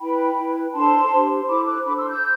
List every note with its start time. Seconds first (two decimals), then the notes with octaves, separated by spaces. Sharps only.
0.01 E4 B4 G5 B5
0.37 E4 B4
0.74 D4 A4 C5 A5 C6
1.11 D4 G4 C5
1.48 E4 A4 C5 B5 D6
1.66 D6 F#6
1.84 D4 A4 C5 B5 D6
1.97 C6 E6
2.09 E6 G6